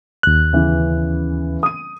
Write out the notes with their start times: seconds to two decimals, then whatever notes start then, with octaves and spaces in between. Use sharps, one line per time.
0.23 D#2 F#6
0.53 C#3 E3 B3
1.63 D#6 D#7